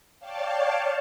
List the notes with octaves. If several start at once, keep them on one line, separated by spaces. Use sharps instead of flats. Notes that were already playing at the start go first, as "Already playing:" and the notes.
C#5 D5 F5 G5 A5